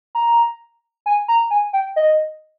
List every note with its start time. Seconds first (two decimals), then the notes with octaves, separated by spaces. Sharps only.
0.15 A#5
1.06 G#5
1.28 A#5
1.51 G#5
1.73 G5
1.96 D#5